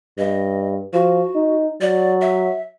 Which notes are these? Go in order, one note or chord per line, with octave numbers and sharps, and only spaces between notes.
G2 D#5
F3 F#4
D#4
F#3 D5
E5